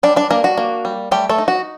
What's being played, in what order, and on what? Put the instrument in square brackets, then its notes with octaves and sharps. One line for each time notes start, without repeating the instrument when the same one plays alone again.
[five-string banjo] G3 D4 D5
D4 D5
A#3 D4 A#4
F#4
A#3
G3
G3 A3 G4
A3 A4
D#4
F#4